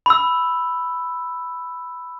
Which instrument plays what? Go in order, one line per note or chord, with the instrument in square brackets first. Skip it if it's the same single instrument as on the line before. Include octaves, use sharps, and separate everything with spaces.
[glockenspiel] B5 E6